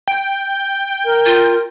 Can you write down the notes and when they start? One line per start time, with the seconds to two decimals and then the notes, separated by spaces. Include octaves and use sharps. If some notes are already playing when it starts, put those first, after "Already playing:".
0.08 G5
1.05 A#4
1.26 F4